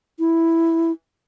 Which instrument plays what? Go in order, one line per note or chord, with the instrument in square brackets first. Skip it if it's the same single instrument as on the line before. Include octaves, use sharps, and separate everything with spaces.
[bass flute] E4